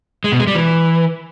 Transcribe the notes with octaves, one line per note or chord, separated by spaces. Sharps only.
G#3
B2
G#3
G3
E3